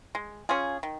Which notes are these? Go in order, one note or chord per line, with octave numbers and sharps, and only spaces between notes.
G#3
C#4 F4 G#4
D#3